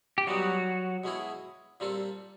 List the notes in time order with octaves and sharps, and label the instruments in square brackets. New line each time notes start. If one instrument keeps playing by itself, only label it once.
[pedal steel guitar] G4
[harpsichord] B2 G3 B3 D#4 [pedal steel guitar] F#3 F#4
[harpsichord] B2 G#3 C#4 E4 G#4
A#2 G3 C4 F4 A4